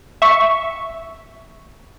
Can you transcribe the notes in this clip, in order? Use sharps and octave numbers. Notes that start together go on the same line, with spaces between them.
E5 C#6